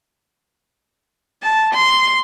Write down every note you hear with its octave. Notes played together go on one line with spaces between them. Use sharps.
A5
C6